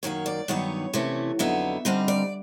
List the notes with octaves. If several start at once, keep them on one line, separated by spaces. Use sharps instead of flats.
F#2 D#3 F#3 A#3 C#5
D5
G2 D#3 F#3 B3 D#4 C#5
C3 E3 A3 C#4
F2 D3 F#3 B3 D#4 E5
G2 D3 G3 C4 D#4 D#5
D5